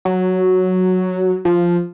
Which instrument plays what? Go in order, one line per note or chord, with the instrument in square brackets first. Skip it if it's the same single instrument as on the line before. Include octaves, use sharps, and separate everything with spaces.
[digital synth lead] F#3
F3